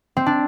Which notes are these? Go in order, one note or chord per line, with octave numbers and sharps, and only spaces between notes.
C4
D4